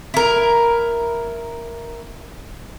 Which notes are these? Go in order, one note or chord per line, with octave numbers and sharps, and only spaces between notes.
E4 A#4